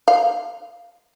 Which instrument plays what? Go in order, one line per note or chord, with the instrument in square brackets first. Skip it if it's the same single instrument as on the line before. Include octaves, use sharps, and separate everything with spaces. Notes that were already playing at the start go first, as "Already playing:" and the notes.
[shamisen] F5